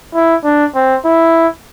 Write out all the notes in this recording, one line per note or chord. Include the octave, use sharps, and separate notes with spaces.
E4
D4
C4
E4